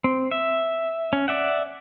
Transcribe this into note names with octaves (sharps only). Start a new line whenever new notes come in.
C4
E5
C#4
D5 E5 F#5